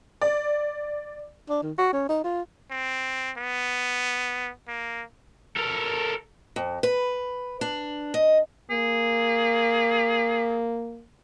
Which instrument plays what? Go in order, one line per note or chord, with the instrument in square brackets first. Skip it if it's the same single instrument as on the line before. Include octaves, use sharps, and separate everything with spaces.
[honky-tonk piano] D5
[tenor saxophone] D4
D#3
F#4
C#4
D#4
F4
[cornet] C4
B3
A#3
[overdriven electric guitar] A4 A#4
[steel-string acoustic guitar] F2
B4
D4
D#5
[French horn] A#3 [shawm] G#4